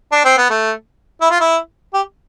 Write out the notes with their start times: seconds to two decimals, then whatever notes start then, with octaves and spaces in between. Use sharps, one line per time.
0.12 D4
0.25 C4
0.38 B3
0.50 A3
1.21 E4
1.31 F4
1.41 E4
1.94 G4